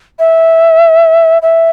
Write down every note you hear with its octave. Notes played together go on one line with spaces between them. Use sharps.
E5
E5